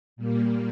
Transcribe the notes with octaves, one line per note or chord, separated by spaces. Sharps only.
A#2 G3 A#3